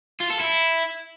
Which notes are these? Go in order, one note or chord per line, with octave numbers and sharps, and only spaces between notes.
F4
A4
E4